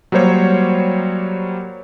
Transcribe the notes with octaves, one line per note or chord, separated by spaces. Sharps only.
F#3 G3 A#3 C5 C#5